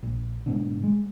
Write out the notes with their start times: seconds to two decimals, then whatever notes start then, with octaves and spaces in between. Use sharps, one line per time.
0.03 A#1
0.46 G#2 B2 D3
0.83 G#3